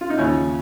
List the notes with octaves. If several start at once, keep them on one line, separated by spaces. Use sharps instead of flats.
F4
D#4
D#2 C#3 F3 C#4